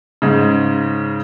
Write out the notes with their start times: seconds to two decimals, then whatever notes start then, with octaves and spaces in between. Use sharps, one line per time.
0.22 G#2 C#3